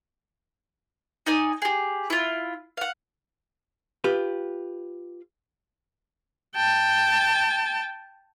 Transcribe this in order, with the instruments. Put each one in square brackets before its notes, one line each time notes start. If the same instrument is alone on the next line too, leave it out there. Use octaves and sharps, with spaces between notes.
[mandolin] D#4 D5 G#5
G4 G#4
E4 F4
F5 F#5
[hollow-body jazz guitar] F4 G4 B4
[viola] G5 A5